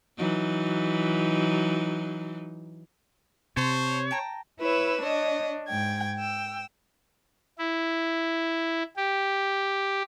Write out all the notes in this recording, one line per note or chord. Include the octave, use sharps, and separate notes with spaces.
E3 F#3 D#4
C3 C5 C#5 A5 C6
G5 A5 A#5
E4 B4 C#5 E6
D4 C#5 D#5
G#2 G5 G#6
G5 E6
E4
G4